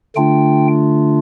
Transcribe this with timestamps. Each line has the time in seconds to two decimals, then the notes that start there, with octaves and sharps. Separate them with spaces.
0.16 D3 A3 D4 F4 G5